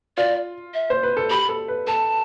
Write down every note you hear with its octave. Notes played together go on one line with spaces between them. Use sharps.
F4 D5
E5
C5
B4
A4
G4 B5
A4
B4
A4 A5